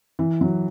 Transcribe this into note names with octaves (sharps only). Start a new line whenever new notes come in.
E3
F#3